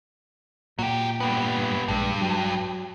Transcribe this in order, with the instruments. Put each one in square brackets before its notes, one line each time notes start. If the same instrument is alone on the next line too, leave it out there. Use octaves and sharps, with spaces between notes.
[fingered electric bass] A#2 [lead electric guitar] F#3 G4
[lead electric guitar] G3 B3
[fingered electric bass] A#1 G#3 [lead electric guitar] G2
[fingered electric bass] F#3